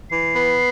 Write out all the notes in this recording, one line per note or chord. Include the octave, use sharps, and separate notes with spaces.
E3 C7
B3